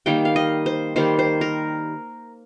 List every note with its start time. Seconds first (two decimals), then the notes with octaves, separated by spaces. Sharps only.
0.06 D#3 G3 A#3 G5
0.25 F5
0.36 D#5
0.66 C5
0.96 D#3 G3 A#3 C5
1.19 C5
1.41 A#4